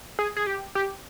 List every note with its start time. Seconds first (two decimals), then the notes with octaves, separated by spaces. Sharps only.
0.19 G#4
0.37 G#4
0.47 G4
0.75 G4